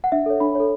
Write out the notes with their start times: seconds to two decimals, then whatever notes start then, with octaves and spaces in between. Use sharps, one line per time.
0.04 F#5
0.12 D4 E5
0.26 A4 C#5
0.40 D4 B5
0.55 A4 C#5